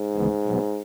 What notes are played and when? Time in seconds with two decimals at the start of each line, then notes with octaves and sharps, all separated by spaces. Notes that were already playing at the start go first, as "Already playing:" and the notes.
Already playing: G#2
0.16 D2 C#3 E3 G#3 B3
0.46 B2 F#3 B3